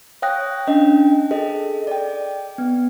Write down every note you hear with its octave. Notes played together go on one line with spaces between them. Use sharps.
C#5 F5 G5 D#6 F#6 A#6
C#4 D4 D#5 G5
G#4 A4 D#5
D5 G5
B3